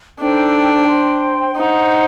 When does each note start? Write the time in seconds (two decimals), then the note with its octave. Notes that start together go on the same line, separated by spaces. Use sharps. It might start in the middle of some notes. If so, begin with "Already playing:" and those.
0.19 D4 D#4 A4 C5 G5
0.87 C5 G5 C6
1.56 D#4 C5 F#5 A#5